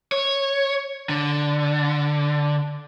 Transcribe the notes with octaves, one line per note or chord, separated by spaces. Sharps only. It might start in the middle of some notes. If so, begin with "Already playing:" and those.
C#5
D3